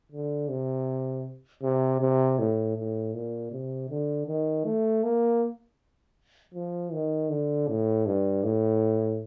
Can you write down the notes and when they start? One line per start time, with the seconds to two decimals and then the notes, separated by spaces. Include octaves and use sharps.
0.12 D3
0.49 C3
1.63 C3
2.01 C3
2.39 A2
2.76 A2
3.14 A#2
3.52 C3
3.90 D3
4.27 D#3
4.65 A3
5.03 A#3
6.54 F3
6.92 D#3
7.29 D3
7.68 A2
8.06 G2
8.44 A2